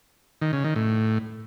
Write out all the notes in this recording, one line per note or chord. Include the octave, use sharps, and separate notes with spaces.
D#3
C#3
D#3
A2